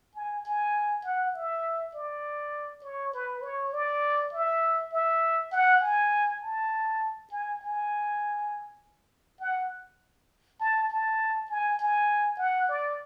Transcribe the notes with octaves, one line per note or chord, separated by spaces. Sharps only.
G#5
G#5
F#5
E5
D5
C#5
B4
C#5
D5
E5
E5
F#5
G#5
A5
G#5
G#5
F#5
A5
A5
G#5
G#5
F#5
D5